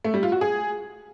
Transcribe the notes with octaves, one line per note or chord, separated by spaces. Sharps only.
A3
G3
F4
F#4
G#4